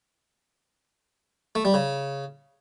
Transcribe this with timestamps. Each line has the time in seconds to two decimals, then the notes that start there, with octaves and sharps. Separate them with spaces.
1.55 A3
1.65 G3
1.74 C#3